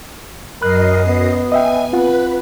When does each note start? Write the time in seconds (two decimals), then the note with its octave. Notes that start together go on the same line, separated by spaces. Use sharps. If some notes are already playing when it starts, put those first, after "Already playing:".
0.62 F#2 A#4 D#5 B5 F#6 C7
1.07 B3
1.52 D#5 E5 G5 G#5
1.93 C4 F4 B4 F#5